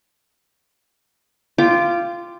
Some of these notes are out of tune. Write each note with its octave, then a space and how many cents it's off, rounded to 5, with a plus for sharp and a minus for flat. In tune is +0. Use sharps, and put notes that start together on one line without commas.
F4 -15 G5 +0 D6 +10